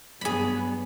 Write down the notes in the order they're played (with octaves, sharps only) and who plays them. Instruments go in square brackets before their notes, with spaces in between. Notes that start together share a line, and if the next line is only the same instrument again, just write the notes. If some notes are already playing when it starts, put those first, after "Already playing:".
[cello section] G2 F#3 B3 [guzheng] G#4 B5